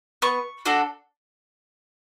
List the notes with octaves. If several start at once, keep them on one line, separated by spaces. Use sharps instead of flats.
B3 C#6
D4 F#4 A4